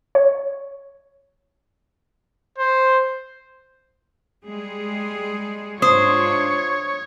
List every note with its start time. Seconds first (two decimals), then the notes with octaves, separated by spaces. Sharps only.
0.15 C#5
2.58 C5
4.44 G3 G#3 G#4
5.82 G#2 D4 F4 C5 C#5 D#6